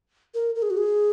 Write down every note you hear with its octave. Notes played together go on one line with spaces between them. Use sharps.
A#4
A#4
G#4
F#4
G#4